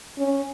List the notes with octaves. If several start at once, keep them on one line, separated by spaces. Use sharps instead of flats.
C#4